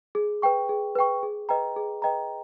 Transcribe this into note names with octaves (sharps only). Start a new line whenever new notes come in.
G#4
B4 G5 C#6
G#4
B4 G5 C#6
G#4
B4 D#5 G5 A#5
G#4
B4 D#5 G5 A#5